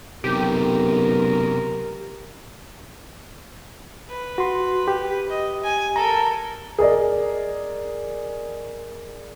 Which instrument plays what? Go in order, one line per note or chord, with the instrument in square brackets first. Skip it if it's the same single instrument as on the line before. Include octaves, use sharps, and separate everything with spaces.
[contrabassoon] B1 [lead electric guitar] F#2 C3 [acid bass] G4 [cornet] A#4
[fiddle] B4
[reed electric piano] F#4 C6
G4
[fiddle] D#5
G#5
[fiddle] A4 A#4 [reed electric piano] A#5
[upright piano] G#4 A#4 D5 D#5